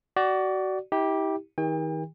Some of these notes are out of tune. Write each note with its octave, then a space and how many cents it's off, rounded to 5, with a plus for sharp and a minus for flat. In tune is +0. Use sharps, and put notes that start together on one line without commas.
F#4 +25 D5 +0
E4 -45 G4 +0
D#3 +35 G4 +35 G5 +45